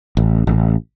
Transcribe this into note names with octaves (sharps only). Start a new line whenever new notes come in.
A1
A1